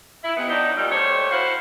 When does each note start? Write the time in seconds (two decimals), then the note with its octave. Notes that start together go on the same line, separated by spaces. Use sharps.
0.24 E4
0.37 C3 G#3 B3
0.50 F#3 D4 D#4
0.77 A#2 F#3 G3
0.92 A3 G4 C5 C#5
1.31 E4 F#4 C5 F5